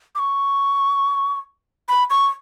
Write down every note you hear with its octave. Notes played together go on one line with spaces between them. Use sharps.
D6
C#6
B5
C#6